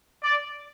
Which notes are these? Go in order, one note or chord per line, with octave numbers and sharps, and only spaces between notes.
D5